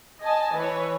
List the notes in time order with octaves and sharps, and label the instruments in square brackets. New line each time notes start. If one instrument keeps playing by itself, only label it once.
[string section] D#5 G#5 A5
E3 B4 C#5